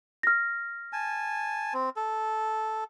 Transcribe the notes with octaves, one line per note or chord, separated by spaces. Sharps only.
F6 A#6
G#5 A5
C4
A4